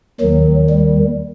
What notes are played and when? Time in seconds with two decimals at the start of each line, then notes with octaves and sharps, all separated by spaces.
0.21 D#2 D#3 F#3
0.70 G3